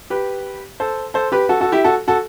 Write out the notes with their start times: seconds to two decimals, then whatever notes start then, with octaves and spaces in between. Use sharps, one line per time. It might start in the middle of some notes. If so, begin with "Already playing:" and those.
0.10 G4 B4
0.80 A4 C5
1.14 A4 C5
1.32 G4 B4
1.49 F#4 A4
1.61 F#4 A4
1.72 E4 G4
1.84 F#4 A4
2.08 F#4 A4